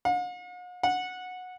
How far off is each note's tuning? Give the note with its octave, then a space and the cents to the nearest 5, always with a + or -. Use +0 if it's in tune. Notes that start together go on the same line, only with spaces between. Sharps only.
F#5 -45
F#5 -15